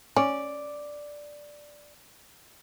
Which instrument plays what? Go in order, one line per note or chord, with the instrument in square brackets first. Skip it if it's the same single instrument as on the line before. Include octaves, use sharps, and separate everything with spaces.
[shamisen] C#4 [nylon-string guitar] D5